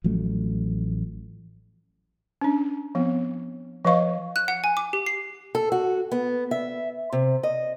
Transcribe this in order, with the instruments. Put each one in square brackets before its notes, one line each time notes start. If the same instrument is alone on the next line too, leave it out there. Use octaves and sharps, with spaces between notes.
[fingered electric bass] A1 F3 F#3 A3
[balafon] C#4 D4
F3 B3 C4
F3 B4 D#5 F5 C#6
[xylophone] F#6
F#5
G#5
D6
G4
C7
[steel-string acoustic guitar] A4
F#4
B3
E5
C3
D#5